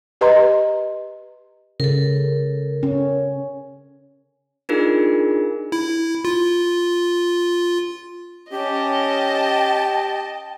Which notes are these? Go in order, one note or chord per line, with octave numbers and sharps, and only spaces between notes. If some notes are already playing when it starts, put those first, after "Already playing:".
G4 B4 D#5 A#5 C6
C#3 A4 A#4
C#4
D4 D#4 F4 G#4 A#4
E4
F4
C#4 G4 D#5 G5 A5